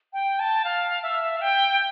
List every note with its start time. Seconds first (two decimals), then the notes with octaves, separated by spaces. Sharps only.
0.13 G5
0.39 A5
0.64 F5
1.03 E5
1.36 F5
1.41 G5